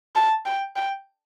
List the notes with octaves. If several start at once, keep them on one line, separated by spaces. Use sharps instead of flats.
A5
G5
G5